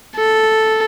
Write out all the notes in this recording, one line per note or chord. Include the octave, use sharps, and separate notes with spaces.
A4